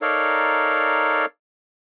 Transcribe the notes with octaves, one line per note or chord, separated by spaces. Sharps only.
D#4 A4 A#4 C#5 D5 F5